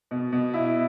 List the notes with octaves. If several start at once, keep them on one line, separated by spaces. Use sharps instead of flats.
B2
B2
E4